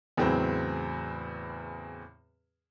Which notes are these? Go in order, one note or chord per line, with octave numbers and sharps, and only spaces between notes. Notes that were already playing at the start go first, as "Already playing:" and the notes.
E2 A2 C#3 F#3 C4